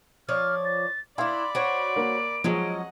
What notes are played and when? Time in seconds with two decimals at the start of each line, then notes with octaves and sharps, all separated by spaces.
0.29 F3 C#5 D5 F6
0.65 A6
1.18 D4 E4 D5 F5 B5 C6
1.55 F#4 C5 C#5 D7
1.96 A#3
2.44 F3 F#3 G#3 C#4 D#5 F#5